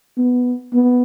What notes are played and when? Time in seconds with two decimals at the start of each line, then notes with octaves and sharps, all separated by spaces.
0.18 B3
0.74 B3